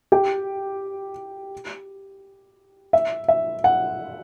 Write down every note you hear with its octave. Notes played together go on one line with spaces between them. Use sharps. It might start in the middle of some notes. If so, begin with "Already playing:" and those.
G4 G5
E5
E5
F#5